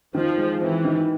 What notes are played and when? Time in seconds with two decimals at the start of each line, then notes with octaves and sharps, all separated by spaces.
0.15 D#3 F3
0.38 G#3
0.62 E3 C4
0.85 D#3